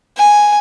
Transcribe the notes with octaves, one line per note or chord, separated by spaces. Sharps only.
G#5